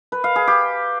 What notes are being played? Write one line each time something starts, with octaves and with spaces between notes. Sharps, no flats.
B4
F5
G#4
G4